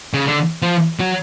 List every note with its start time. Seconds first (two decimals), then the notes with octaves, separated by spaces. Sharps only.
0.14 C#3
0.26 D3
0.62 F3
0.99 F#3